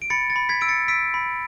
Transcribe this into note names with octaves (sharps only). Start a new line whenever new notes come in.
D7
B5 A6 C#7
A6 C#7
B5
G#6 B6
E6 D7
A6 C#7
E6 B6 D7
B5